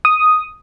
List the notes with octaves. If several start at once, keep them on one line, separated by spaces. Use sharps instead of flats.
D#6